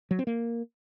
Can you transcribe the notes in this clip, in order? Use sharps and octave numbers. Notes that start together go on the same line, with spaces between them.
F#3
C4
A#3